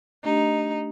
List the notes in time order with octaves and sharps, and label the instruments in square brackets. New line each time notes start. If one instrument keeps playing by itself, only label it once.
[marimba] A3 D4 G4 [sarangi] D#4